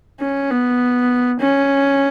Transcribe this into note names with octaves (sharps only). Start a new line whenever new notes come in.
C#4
B3
C#4